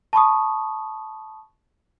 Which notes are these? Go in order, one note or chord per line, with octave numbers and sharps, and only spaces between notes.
A5 B5 C#6 D#6